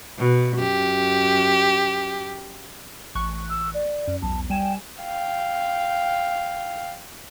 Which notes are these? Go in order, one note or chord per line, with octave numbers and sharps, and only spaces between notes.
B2
F#2 G4
A1 C#6 F#6
E6
D5
F#2
B1 E2 A5
G3 G5 G#5 E7
F5 G5